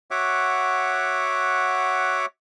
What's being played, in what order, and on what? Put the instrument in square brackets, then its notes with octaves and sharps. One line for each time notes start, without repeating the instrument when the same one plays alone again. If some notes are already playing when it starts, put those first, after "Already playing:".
[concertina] F#4 C#5 E5 F#5 D6